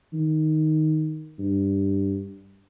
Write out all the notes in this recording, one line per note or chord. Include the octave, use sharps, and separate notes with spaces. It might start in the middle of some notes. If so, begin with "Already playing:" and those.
D#3
G2